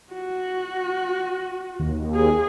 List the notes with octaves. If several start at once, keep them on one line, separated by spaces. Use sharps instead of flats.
F#4
D#2
G#4